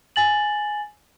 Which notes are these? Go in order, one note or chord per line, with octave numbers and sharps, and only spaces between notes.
G#5 A6 F#7